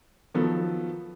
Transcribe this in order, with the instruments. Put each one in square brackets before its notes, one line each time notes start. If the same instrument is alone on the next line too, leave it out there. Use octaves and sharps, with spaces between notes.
[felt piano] D#3 F3 F#3 B3 A4